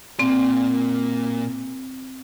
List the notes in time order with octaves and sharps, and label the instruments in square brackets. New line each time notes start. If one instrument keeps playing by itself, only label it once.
[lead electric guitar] A#2 D5 [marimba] C4